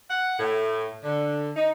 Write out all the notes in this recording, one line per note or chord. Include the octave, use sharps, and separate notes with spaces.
F#5
A2
D3
D#4